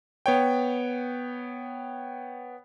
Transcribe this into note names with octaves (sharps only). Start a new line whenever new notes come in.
B3 C#5 G5